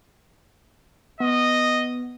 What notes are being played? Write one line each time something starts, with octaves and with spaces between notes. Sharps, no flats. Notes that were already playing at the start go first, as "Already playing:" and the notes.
B3 D#5